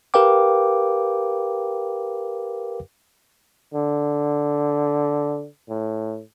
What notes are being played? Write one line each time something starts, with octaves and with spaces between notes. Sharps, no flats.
G4 A#4 B4 F5 G5 D6
D3
A2